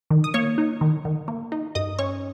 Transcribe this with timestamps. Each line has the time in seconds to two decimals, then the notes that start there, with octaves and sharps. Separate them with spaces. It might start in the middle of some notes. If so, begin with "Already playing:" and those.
0.10 D#3
0.24 D#6
0.34 A#3 C#5 C#6
0.58 D#4
0.81 D#3
1.05 D#3
1.28 A#3
1.52 D#4
1.75 G2 D#5 D#6
1.99 C#4 C#5 C#6